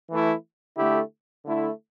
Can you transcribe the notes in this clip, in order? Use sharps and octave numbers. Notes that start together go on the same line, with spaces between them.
E3 A3 E4
D3 A3 E4 G4
D3 A3 E4